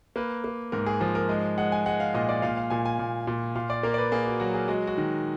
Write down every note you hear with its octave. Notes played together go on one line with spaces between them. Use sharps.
A#3 B4
A#3
G#2 A#4
G#4
F3 G#4
A#4
G#3 D#5
G#3 F#5
G#5
G#3 F#5
F5
A#2 D#5
D5
A#2 F5
F5
A#2 G#5
G#5
A#2
A#2
A#2 F5
D5
A#3 A#4
D5
B4
A#3 G#4
F#4
F#3 F#4
G#4
G#3 F#4
F#4
D#3